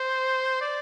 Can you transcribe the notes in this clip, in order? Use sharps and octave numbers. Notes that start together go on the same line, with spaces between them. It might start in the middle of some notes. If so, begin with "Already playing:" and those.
Already playing: C5
D5